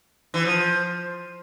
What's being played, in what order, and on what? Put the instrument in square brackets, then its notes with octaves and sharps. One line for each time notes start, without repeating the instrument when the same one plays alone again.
[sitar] E3
F3